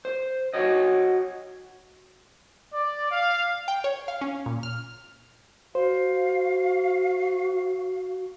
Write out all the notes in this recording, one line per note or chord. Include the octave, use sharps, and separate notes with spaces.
C5
F#4 C#5 D#5
D5
F5
G5
C#5
F5
C#4
A#2
F6
F#4 C5 F5